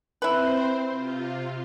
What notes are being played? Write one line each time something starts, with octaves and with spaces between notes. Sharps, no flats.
C4 E4 B4 C5
C3 F4